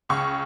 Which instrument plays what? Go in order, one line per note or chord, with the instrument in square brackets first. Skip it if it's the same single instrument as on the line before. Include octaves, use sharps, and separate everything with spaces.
[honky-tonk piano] C#2 C#3 C#6